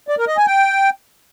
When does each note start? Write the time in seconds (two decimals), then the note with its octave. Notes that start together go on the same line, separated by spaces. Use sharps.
0.08 D5
0.18 A#4
0.27 D#5
0.37 G#5
0.47 G5